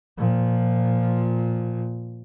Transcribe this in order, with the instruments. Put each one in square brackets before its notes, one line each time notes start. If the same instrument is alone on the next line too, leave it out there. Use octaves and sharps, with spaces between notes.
[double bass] A#2 F3